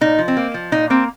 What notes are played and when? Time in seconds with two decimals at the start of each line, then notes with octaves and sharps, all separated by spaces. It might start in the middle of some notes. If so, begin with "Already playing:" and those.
0.01 A#2 D#4
0.19 F3
0.28 C4
0.37 A#3
0.54 F3
0.72 A#2 D#4
0.90 A#3 C4